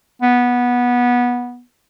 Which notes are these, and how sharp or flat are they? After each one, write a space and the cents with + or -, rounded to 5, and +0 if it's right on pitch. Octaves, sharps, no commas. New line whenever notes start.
B3 -15